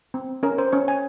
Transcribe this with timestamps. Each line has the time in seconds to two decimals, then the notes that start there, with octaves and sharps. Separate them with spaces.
0.14 C4
0.43 C#4 A#4
0.58 C5
0.73 C#4 C#5
0.88 G#5